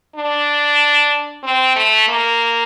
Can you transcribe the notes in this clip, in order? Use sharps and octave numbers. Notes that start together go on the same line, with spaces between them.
D4
C4
A3
A#3